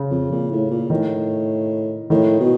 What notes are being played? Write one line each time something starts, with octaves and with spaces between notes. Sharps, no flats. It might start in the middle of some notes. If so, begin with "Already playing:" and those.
Already playing: C#3
F2
A#2
A2
A#2
A2 D#3
A2 D#3
B2